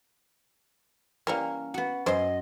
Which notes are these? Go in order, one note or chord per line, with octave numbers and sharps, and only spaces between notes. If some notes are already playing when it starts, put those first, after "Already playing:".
E3 G3 A#3 C#4 A#4
B3 F#4
F#2 B3 C5 D#5 C6